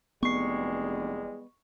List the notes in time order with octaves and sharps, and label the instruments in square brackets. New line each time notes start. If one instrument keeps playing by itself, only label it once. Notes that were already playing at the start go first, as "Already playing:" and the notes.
[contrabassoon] F1 [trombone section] E2 G3 G#3 [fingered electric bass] B3 [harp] C#6 C7